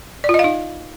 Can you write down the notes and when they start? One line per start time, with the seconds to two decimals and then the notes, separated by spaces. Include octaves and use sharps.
0.24 D5
0.29 F4
0.34 D#5
0.39 F5
0.44 D#4